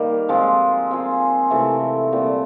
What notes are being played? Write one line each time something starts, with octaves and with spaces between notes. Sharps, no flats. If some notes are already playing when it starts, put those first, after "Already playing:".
Already playing: D#3 G3 A#3
F3 G#3 C4 F4
G#3 C4 F4 G#4
C3 E3 A3 C4
A#2 G3 C4